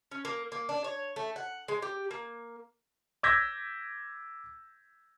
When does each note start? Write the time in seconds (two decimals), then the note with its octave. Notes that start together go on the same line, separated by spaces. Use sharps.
0.12 C#4
0.25 A#3
0.52 A#3
0.69 D4
0.84 C#5
1.16 A3
1.36 F#5
1.68 G#3
1.82 G4
2.11 A#3
3.23 D6 E6 G6 G#6 A#6 B6